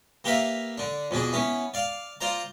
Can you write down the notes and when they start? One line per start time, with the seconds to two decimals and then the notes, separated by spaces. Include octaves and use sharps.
0.24 A#3 G4 A#4 B4 E5 F5
0.78 D3 D4
1.11 F2 B2 D4 G#4
1.33 B3 C#4 E4
1.74 D5 F5
2.21 F4 C5 D5 A#5